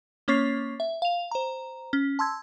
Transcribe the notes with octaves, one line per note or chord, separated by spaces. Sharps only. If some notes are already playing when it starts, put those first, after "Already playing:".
A#3 C#4 C#5 C#6 A6 C7
E5
F5 F7
C5 A#5
C#4
A5 C6 E6 G#6